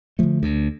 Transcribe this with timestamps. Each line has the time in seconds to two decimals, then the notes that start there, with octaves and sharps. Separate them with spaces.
0.19 D3 F3 A3
0.43 D2